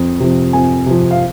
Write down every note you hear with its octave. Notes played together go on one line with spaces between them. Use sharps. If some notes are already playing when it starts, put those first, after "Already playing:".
Already playing: F2
C3 F3
F2 G#5
C3 F3
F5